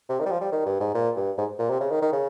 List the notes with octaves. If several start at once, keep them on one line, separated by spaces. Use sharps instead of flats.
C3
D#3
G3
F3
G3
D#3
G2
G#2
A#2
G2
G#2
A#2
C3
C#3
D#3
D#3
C#3